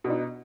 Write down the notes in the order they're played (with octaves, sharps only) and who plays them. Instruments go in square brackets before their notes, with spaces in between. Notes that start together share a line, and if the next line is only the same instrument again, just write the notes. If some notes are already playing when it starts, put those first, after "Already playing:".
[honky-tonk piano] B2
D4
D#4